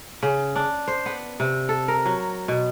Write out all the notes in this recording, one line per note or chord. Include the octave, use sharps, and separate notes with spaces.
C#3
D4
C5
B3
C3
A4
A#4
F#3
B2